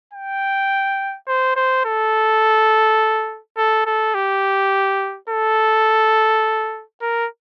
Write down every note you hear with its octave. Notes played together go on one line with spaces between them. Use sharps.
G5
C5
C5
A4
A4
A4
G4
A4
A#4